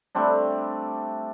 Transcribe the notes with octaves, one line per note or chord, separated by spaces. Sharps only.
G3 A3 C4 D4